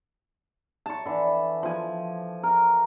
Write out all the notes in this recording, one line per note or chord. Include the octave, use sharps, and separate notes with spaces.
A5 C#6
D3 E3
F3 G#5
A#4